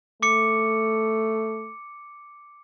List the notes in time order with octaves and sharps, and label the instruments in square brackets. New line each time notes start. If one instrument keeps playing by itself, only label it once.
[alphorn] A3 [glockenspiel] D6 C#7